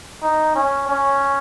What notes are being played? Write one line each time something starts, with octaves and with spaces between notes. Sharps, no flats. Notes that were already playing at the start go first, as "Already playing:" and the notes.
D#4
C#4
C#4